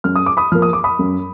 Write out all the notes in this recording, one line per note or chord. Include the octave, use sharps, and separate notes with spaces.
F#2 F6
D#6
D6
B5 D#6
F3 A#3 F6
D#6
D6
B5 D#6
F#2